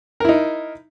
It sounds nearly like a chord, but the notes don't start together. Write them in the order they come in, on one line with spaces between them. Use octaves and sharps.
A#4 E4 D#4